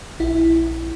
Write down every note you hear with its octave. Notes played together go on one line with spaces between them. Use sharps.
A#1 E4